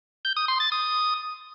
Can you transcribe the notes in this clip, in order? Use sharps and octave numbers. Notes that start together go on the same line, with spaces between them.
G6
D#6
C6
A6
D#6